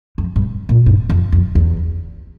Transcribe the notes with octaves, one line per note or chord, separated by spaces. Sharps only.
F2
G2
A#2
G2
F2
F2
E2